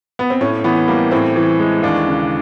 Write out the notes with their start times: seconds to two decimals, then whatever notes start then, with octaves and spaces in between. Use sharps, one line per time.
0.19 B3
0.30 C4
0.41 A2 C#4
0.64 E3 B3
0.88 G3 A#3
1.11 A2 C4
1.36 E3
1.59 G#3
1.83 D#2 D4
2.07 C#3